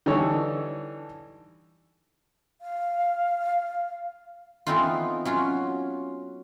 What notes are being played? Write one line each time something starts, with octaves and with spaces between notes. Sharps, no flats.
D3 E3 G3 D#4 A4 C#5
F5
E3 A3 B3 C4 D#4 F4
F#3 C#4 F4 F#4